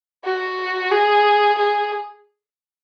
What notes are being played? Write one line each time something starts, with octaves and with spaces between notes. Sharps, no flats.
F#4
G#4
G#4